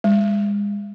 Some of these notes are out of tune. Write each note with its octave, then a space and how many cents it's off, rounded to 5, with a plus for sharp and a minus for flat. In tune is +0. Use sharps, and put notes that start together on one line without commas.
G#3 -35